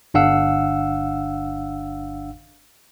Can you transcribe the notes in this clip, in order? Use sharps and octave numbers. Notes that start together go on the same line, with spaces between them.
G1 D4 F5 F#5 E6